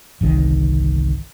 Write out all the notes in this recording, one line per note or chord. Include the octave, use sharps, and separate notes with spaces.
G1 C2 D#3